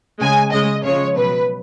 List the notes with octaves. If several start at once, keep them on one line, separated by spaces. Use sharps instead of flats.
C#3 G#3 G#5
C#3 G#3 D#5
C#3 F3 G#3 C#5
B2 F#3 B4